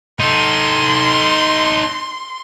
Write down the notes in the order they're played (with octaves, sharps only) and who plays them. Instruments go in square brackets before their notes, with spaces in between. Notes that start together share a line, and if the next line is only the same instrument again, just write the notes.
[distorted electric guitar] D#4 A4 [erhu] C6